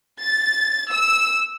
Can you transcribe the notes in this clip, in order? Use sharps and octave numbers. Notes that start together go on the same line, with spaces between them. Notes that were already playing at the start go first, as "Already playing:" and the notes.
A6
E6